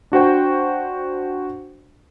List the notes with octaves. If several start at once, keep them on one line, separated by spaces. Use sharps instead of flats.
D4 F#4 C5 G5